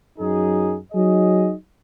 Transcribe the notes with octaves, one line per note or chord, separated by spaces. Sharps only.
F#2 F#3 D#4 G#4
F#3 D#4 G#4 D#5